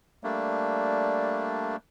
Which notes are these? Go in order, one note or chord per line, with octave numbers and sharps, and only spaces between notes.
G3 A3 A#3 D4